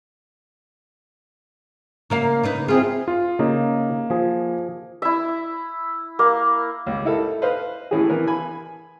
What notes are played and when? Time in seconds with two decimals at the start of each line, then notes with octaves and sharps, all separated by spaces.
2.10 C#3 A#3 F5
2.43 C#3 D#4 B4
2.68 C4 E4 F4 G#4
3.08 F4
3.39 C#3 A#3 D#4
4.10 F3 G#4
5.02 E4 E5
6.19 A#3
6.86 C#2
7.05 D#4 E4 A4 A#4
7.42 B4 C5 D#5 F5
7.91 A2 E3 C#4 G#4
8.09 E3 B3 A#4
8.27 G#5 B5